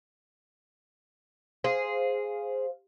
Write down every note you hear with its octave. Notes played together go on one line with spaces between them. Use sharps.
G#4 C5 F5